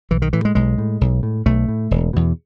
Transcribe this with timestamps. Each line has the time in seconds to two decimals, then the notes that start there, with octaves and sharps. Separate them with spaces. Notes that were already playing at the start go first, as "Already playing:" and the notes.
0.11 B1 E3
0.22 D#3
0.33 A2 E3
0.45 G#3
0.55 B1 G#3
0.78 A2
1.01 B1
1.23 A2
1.46 B1 A3
1.68 A2
1.91 E1
2.13 E2 B2